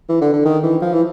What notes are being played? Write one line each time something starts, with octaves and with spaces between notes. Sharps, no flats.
E3
D3
D3
D#3
E3
F3
E3